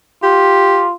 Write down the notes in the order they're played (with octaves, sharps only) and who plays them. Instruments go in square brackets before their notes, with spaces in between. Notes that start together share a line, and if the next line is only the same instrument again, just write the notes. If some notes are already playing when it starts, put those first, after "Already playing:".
[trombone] F4 [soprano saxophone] G4